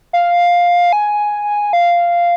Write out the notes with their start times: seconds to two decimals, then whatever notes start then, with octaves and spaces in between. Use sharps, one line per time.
0.13 F5
0.93 G#5
1.73 F5